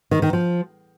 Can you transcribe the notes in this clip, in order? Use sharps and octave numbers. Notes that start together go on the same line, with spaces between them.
D#3
D#3
F3